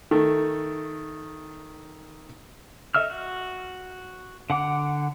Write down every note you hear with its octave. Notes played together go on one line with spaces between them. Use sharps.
D#3 A3
A4 D#5 E5 E6 F6
F#4
D3 F#5 D6